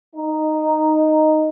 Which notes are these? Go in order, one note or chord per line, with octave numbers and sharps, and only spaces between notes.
D#4